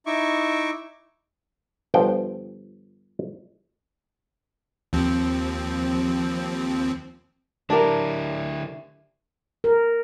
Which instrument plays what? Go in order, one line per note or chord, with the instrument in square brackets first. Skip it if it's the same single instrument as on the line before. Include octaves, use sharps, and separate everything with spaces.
[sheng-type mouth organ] D#4 E4 E5 C#6 D6
[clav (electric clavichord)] G1 F3 C5 G5
[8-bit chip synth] D#2 F3 C4
[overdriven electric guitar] D3 E4 [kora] D4 G4 A#4
[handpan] A#4